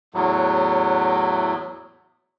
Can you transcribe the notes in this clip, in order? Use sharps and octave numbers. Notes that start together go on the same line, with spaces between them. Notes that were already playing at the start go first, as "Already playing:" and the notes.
E2 A2 F#3